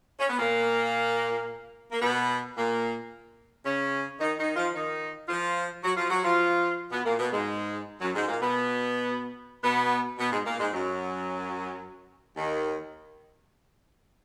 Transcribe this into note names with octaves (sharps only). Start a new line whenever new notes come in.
C#4
B3
A#2 A#3
A#3
B2 B3
A#2 A#3
C#3 C#4
D#3 D#4
D#3 D#4
F3 F4
D#3 D#4
F3 F4
F#3 F#4
F3 F4
F#3 F#4
F3 F4
B2 B3
A#2 A#3
B2 B3
G#2 G#3
F#2 F#3
G#2 G#3
A#2 A#3
B2 B3
B2 B3
B2 B3
G#2 G#3
A#2 A#3
G#2 G#3
F#2 F#3
D#2 D#3